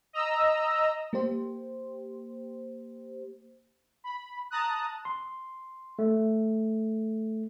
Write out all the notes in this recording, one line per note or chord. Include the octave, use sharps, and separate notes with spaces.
D#5 A#5 E6
A#3 G4 C5
B5
A5 A#5 D#6 F#6
C6
A3